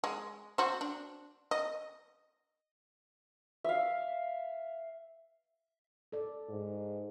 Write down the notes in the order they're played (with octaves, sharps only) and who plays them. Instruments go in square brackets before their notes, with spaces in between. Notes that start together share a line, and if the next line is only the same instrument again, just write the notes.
[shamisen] G#3
F#4 C5
D4
D#5
[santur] E5 F5
[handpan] A4 D5
[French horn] G#2